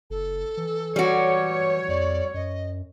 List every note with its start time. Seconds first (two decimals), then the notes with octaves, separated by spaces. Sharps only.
0.10 F#1 A4
0.57 E3
0.96 E3 G3 F#4 C#5
1.88 F2 D5
2.34 F#2 D#5